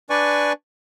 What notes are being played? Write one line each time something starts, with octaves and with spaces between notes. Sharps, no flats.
D4 B4 D5 G#5 C#6